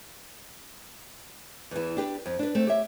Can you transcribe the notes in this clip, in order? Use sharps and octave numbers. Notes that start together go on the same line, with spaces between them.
E2 E3
D4 G4 B4
F2
D4 B4
A3 C4
G4 C#5 E5